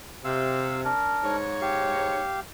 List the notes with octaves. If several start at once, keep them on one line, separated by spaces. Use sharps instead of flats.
C3 F5 E6
D4 A#4
G#2 C#5
G4 F5